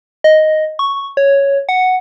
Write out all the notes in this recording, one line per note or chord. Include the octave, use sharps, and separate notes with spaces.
D#5
C#6
C#5
F#5